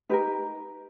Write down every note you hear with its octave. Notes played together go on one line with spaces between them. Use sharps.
D#4 G4 A#4 B4